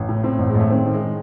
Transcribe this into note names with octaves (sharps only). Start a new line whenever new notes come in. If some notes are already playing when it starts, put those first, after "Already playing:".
Already playing: A1
A2
A2 C4
A1
G#3
A1
A3
D#3 C4
D#3
G#3